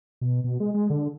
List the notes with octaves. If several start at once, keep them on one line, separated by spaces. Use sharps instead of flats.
B2
B2
G#3
G#3
D3